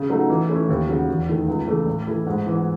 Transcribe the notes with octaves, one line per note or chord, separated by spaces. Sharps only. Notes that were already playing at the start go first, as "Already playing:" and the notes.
Already playing: C#3
F#3 A3 D#4
E3
A3 C#4 E4
D#2
C#3 F#3
E2
D#3 A3 E4
C#2
C#3 E3 A3
A2
E3 A3 E4
G#2
E3 B3 E4